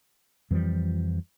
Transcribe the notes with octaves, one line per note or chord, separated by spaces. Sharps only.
F2 E3 F3 G3